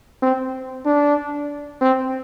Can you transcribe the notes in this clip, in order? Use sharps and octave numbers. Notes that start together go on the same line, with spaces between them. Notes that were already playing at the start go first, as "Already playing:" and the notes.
C4
D4
C4